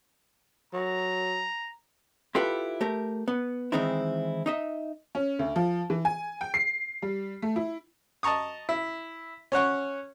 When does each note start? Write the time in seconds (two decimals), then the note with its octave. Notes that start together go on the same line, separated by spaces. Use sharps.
0.73 F#3 A#5
2.35 E4 F4 G4 A4 B4
2.81 A3 G4 A#4
3.28 B3
3.72 D#3 E3 G#3 C4 D#4 E4
4.46 D#4 D#5 E5
5.15 C#4
5.39 D2
5.56 F3
5.90 E3
6.05 G#5
6.41 G5
6.54 C7
7.02 G3
7.42 A3
7.56 E4
8.23 D#5 A5 A#5 C#6 D#6
8.69 E4
9.52 C#4 C#5 F#5 C#6